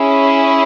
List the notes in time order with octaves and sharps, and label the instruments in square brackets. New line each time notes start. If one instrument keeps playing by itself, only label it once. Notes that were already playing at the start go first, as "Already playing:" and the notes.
Already playing: [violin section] C#4 E4 G#4